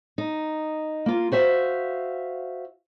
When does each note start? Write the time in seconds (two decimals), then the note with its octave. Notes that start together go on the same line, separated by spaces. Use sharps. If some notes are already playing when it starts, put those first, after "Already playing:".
0.18 D#4
1.06 A#3 F4
1.32 F#4 C5 E5 F5